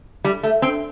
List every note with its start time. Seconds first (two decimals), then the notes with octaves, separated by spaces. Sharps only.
0.24 G3
0.43 A3
0.62 C4